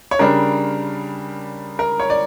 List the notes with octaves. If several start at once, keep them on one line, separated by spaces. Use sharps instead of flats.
C#5
C#3 G3 D4 A#4
A#4
C#5
D5